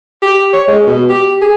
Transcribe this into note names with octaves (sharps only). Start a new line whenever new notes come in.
G4
C#5
G#3
B2
G4
G#4